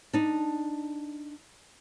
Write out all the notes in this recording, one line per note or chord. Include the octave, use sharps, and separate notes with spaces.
D4 D#4